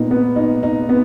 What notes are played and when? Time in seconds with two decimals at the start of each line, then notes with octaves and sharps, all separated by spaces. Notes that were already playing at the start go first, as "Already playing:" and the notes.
Already playing: A#2 B3 D#4
0.11 B3
0.36 D#4
0.63 D#4
0.89 B3